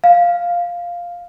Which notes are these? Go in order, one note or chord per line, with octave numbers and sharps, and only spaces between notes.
F5